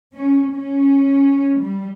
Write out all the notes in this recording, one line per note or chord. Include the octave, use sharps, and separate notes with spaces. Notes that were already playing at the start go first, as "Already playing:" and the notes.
C#4
C#4
G3